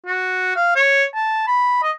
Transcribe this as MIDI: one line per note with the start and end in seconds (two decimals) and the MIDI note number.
0.06 0.55 66
0.56 0.74 77
0.76 1.04 73
1.15 1.45 81
1.47 1.79 83
1.82 1.91 75